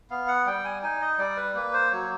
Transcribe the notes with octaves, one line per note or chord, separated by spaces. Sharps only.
B3 F5
F#5
G3 G5
G#5
D#4 G#5
D#5
G3 D5
B4
A#3 B4
C5
F#3 C#5